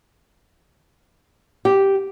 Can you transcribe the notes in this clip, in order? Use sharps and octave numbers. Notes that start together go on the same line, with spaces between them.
G4